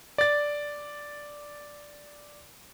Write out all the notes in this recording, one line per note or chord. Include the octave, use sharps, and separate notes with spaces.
D5 A6